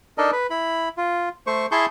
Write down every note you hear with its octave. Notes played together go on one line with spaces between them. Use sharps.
D4 D#4 A4 A#4 D#5
B4
E4 B5
F4
A3 C5 C#6
E4 G#4 A5 C6 C#6 G6